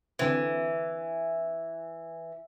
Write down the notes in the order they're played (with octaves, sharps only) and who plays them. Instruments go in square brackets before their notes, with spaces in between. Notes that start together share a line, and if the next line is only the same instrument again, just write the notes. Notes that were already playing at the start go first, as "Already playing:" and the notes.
[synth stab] D3 C4 [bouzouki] E3